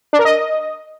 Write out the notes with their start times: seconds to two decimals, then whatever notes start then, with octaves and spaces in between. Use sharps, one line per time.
0.13 D4
0.19 A#4
0.25 D#5